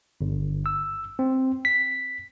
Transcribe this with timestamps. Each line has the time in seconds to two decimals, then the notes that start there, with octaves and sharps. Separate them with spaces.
0.21 G1
0.66 E6
1.19 C4
1.65 B6